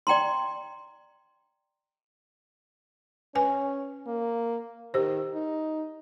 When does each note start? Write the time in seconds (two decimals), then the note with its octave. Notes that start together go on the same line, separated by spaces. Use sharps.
0.07 D5 G5 A#5 C6
3.35 C#4 B4 G#5
4.07 A#3
4.94 D#3 G4 C5
5.34 D#4